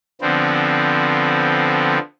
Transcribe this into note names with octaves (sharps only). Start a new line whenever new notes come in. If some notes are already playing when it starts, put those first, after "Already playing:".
D3 F3 B3 C4